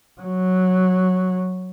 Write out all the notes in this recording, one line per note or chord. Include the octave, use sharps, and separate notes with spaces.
F#3